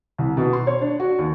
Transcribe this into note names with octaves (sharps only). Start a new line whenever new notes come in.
C2
B2
C6
C#5
D4
F#4
D#2